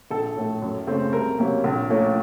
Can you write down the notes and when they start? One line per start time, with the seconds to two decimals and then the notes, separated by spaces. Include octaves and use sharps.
0.10 A#1 A4
0.36 A2 A3
0.62 F#2
0.87 C#3 A3 C4
1.13 C2 A#4
1.39 C3 F#3 A#3 C#4
1.64 A#1
1.90 A#2 A3 C#4